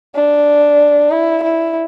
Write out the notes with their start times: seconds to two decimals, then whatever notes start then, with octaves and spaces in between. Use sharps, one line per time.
0.15 D4
1.11 E4
1.43 E4